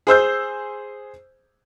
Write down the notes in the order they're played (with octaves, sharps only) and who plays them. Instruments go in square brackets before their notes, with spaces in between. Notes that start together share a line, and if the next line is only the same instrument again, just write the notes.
[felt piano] G#4 C5 E6 G6